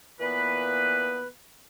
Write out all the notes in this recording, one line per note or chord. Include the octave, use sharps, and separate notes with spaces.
A#2 E3 B3 B4